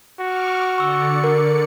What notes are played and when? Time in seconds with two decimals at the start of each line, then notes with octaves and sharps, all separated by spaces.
0.20 F#4 C#6 D6 F6
0.78 D3 D5 C#6 E6 C#7
1.24 A#4